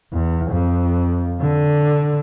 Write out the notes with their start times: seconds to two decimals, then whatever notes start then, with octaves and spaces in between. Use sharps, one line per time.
0.13 E2
0.50 F2
1.40 D3